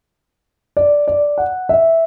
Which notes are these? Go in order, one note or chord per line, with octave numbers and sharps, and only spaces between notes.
D5
D5
F#5
E5